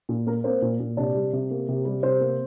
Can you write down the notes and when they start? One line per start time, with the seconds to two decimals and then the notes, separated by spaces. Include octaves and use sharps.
0.09 A#2
0.26 A#3 A#4
0.44 A#3 C4 C5
0.62 A#2
0.80 A#2
0.97 C3 D4 D5
1.14 G3
1.33 C3
1.51 A#3
1.68 C3
1.85 G3
2.03 C3 C4 C5
2.21 A#3